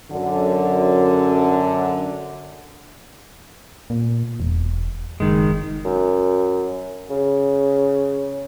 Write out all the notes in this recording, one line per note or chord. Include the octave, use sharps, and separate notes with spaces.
F#2 D3
A#2
E1
F#1 D#3 G#3
F#2
C#3